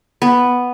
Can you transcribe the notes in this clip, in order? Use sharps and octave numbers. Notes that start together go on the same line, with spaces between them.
B3